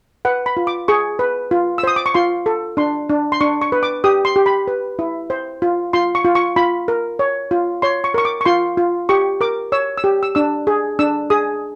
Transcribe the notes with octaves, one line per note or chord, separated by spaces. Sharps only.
B4 F#5
B5
F4
D6
G#4 C#6
B4
F4
E6
C5 D#6
D6
C#6
F4 C6
A4
D4 C6
D4
C6
D4 C#6
C#6
B4
D6
G4 D#6
C6
G4
B5
B4
E4
C5
F4
F4 C6
C#6
F4
C#6
F4 B5
A#4
C#5
F4
C#5 C6
C#6
A#4 C#6
D6
C#6
F4 C6
F4
G4 C#6
A#4 D6
C#5 E6
E6
G4
E6
D4 E6
G#4
D4 E6
G#4 D#6